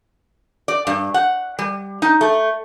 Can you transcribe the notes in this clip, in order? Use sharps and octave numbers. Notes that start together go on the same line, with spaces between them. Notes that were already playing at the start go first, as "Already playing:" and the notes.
D5
G2
F#5
G3
D#4
A3